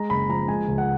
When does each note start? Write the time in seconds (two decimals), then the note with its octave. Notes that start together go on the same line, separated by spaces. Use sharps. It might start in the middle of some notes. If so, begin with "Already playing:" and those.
Already playing: G#3 A#5
0.10 F#1 B5
0.29 F3 A#5
0.48 G#3 G#5
0.68 C#2
0.78 F#5